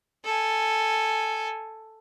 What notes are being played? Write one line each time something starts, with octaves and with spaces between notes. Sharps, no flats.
A4 G#5